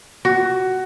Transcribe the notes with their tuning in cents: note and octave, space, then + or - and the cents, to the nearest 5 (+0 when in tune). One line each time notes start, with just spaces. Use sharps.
F#4 +15